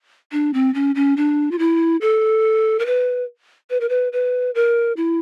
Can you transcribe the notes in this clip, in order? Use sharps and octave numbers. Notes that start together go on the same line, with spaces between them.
D4
C4
C#4
C#4
D4
F4
E4
A4
A#4
B4
B4
A#4
B4
B4
A#4
E4